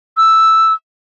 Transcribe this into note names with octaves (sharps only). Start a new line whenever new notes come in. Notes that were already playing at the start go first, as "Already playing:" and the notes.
E6